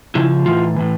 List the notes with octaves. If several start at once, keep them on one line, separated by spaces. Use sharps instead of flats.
C#3 F3 E4
A2 E3 F4
A2 E3